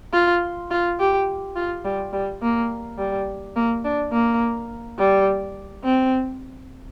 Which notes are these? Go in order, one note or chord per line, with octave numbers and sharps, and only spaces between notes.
F4
F4
G4
F4
G3
G3
A#3
G3
A#3
D4
A#3
G3
C4